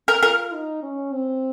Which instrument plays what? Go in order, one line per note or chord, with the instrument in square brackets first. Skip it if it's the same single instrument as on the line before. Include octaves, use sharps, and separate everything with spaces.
[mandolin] A#4
[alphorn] F4 [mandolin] A#4
[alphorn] D#4
C#4
C4